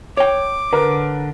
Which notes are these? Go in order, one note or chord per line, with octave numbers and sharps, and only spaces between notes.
C#5 G5 D6
D3 A#4 B4